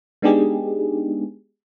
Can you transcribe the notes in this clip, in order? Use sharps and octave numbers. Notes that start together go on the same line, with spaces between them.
G#3 B3 D4 D#4 G4 G#4